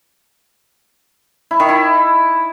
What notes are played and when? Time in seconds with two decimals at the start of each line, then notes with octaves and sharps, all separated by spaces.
1.51 E4
1.60 D#3
1.69 E4